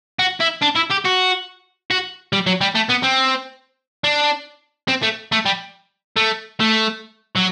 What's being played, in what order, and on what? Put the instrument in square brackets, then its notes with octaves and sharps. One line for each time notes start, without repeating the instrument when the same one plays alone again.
[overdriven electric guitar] F#4
E4
D4
E4
G4
F#4
F#4
G3
F#3
G3
A3
B3
C4
D4
C4
A3
A3
G3
A3
A3
F#3